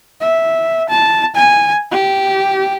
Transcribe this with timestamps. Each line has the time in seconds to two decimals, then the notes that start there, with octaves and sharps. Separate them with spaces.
0.21 E5
0.89 A5
1.36 G#5
1.92 G4